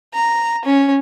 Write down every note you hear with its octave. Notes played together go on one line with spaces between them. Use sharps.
A#5
C#4